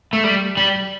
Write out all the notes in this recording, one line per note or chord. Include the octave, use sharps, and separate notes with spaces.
A3
G3
G3